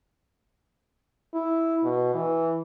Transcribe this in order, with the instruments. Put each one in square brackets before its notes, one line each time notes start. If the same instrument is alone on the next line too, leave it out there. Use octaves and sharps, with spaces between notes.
[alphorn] E4
B2
E3